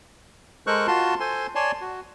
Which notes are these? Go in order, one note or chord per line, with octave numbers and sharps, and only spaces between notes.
G#3 A4 A#4 C5 C#6 F#6
F4 F#4 A5 C6
A4 C5 G#5 C6
C#5 D5 G#5 A5 C6
F#4